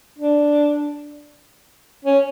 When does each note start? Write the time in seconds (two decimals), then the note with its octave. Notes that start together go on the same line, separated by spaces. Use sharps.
0.18 D4
2.05 C#4